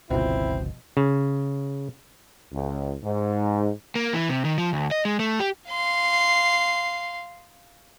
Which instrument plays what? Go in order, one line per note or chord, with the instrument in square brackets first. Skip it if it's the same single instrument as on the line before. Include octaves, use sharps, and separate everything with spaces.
[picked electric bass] G1 C#2 [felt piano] B2 F3 [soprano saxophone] C4 [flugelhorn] E4
[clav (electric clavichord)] C#3
[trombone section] C#2
G#2
[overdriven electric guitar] A#3
E3
C3
D#3
F3
D2
D#5
G#3
A3
G4
[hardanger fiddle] F5 C6